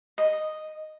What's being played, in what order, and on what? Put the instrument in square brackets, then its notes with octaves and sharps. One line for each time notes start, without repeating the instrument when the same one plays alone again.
[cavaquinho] D#5